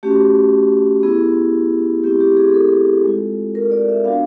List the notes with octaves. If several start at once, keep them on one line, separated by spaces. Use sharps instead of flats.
A3 C#4 F#4 G4
B3 E4 G#4
A3 C4 E4 G4
G4
G#4
A4
G#3 C4 F4
A#4
D5
E5
B3 D4 F#4 F5